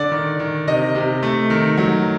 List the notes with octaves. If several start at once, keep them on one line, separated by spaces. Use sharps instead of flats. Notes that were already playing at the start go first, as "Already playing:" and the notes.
Already playing: D3 D5
D#3
D#3
C3 D#5
C3
A3
D#3
F#3